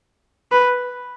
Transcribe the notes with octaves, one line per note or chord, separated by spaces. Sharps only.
B4